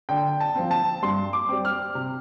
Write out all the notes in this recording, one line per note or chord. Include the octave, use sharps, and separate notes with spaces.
D3 G5
A5
F3 C4
A5
G2 C6
D6
G3 C4
F6
C3